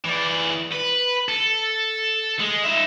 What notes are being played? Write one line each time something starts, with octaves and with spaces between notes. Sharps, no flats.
E3 D5
B4
A4
G#3
D#4 E5